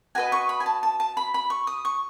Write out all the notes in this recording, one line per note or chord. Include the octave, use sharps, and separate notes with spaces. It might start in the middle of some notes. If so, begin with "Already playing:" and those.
F#4 B4 D#5 G#5
C#6
B5
G#5
A5
A5
A5
B5
B5
C#6
D#6
C#6